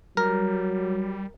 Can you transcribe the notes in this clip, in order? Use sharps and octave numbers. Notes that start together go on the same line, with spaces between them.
F#3 G3 A#4